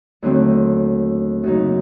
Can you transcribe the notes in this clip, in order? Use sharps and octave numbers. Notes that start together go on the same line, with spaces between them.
D#2 D3 F#3 A3 C4
F#2 C#3 F#3 A#3 D#4